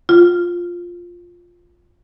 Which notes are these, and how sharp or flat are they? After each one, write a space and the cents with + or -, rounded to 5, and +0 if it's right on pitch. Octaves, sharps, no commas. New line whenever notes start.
F4 +5